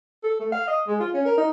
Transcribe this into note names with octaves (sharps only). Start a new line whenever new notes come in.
A4
A3
F5
D#5
G#3
F4
C#4
A#4
D#4